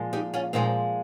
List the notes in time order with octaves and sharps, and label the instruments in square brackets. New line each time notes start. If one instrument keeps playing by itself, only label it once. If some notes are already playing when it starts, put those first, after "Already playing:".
Already playing: [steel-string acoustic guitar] A#2 F3 G#3
D#4 G4
C#4 F4
A#2 F3 G#3 C4 D#4